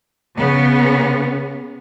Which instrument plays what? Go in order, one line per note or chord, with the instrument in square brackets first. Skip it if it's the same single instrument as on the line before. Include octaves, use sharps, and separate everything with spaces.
[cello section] C#3 B3